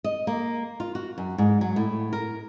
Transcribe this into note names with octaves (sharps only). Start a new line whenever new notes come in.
D#5
A#3
F4
F#4
F#2
G#2
F#3
A2
A#4